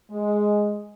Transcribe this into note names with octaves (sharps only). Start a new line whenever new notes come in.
G#3